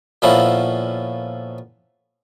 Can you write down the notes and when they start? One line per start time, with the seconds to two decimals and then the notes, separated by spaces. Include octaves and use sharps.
0.22 A#2 F3 B3 C#4 E4 A4